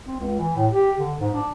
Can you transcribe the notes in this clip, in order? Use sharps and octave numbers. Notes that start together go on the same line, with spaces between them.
C4
C#2
E3
A2
G4
D3
G#2
D4